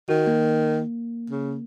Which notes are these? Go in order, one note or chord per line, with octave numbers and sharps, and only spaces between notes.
D#3 F#4
A#3
C#3